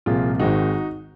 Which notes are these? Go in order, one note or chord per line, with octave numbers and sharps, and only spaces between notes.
C2 A#2 F3 F4 G#4
G#1 G#2 D#3 G#3 D#4 F#4